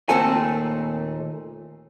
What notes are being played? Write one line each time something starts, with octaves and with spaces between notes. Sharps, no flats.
D#2 A#2 A3 C4 A4 G#5